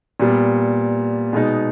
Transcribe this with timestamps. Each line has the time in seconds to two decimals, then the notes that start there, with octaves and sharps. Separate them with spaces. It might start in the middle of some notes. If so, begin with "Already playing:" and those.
0.20 A#2 G3 B3
1.33 B2 G#3 B3 D#4